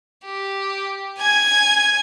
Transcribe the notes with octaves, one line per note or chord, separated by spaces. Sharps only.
G4
G#5 G#6